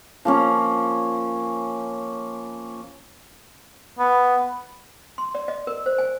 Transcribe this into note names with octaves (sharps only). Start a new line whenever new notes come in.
F3 A#3 C#4
B3
C6
D5
D#5
A#4
C5
G#5